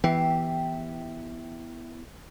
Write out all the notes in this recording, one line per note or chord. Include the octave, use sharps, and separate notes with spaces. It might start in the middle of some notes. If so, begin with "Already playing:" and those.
E3 B3 E4 G4 E5 G5